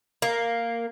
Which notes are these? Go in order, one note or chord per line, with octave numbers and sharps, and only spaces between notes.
A#3